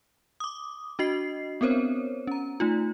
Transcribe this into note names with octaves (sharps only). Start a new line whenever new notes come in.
D6 D#6
D4 F#4 D#5 C7
B3 C4 A#4 C5 C#5
C#4 A#5
A3 D#4 F4